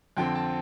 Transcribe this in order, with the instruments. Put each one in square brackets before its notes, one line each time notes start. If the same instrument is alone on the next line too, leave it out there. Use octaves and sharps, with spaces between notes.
[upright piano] F2 D3 F3 C4 G5
A5